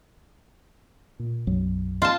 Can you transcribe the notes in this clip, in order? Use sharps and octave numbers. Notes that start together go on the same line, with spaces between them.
A#2
B1 F#2 F#3
F4 A5